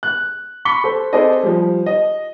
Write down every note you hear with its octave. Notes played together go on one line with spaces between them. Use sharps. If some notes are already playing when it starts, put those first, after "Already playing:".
F#6
B5 C#6 B6 C#7 G7
A4 C5
C4 G#4 A4 C5 D5 D#5
F3 G3
D#5